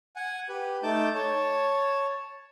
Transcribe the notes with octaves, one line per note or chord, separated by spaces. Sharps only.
F#5 G#5
G4 B4
A3 D#4 A5 D6 G6
C#5 A5